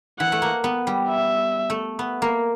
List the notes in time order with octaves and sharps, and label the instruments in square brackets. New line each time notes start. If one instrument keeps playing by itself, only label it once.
[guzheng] E3 [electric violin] F#5
[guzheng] A3
A#3
B3
G3
[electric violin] E5
[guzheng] A3
B3
A#3